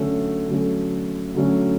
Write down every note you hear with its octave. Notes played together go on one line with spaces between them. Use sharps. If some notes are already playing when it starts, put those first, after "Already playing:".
Already playing: D3 F#3 A3 C#4
D3 F#3 A3 C#4
D3 F#3 A3 C#4